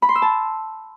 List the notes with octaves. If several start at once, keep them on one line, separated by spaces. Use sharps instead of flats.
B5
C6
E6
A5